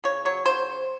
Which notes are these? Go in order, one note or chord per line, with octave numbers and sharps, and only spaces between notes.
C#3 C#5
F#3 C#5
C#3 C5